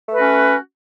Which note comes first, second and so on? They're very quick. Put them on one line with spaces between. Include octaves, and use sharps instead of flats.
A3 B4 F#4 C#4